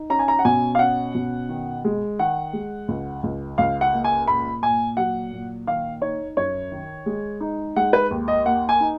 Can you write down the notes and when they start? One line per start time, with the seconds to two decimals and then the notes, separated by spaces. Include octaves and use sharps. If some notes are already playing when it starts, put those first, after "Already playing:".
Already playing: D#4
0.10 C#4 A#5
0.19 G#5
0.28 A#5
0.39 F#5
0.45 B2 G#5
0.75 F5
0.79 C#4 F#5
1.15 B2
1.49 D#3
1.84 G#3
2.19 D#3 F#5
2.53 G#3
2.88 C#2
3.23 C#2
3.58 C#2 F5
3.81 F#5
3.93 A#3
4.04 G#5
4.28 A#2 B5
4.62 A#2 G#5
4.97 F#3 F#5
5.33 A#2
5.67 D#3 F5
6.02 D#4 C#5
6.37 F#2 C#5
6.72 D#3
7.06 G#3
7.41 D#4
7.76 G#3 F#5
7.93 B4
8.11 D#2
8.28 D#5
8.46 A#3 F#5
8.69 G#5
8.81 D#4